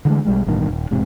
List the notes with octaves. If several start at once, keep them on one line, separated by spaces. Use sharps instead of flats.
D3 E3 G#3 A3
B1 G3 G#3
A1 G2 B2 D#3
D#1
E1 G#2 C3